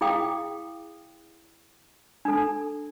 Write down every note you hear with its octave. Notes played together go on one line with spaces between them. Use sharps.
E4 G#4 F5 G5 D#6
D4 A4